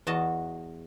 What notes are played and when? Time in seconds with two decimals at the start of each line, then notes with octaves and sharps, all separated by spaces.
0.07 E2 F#4 D#5 A5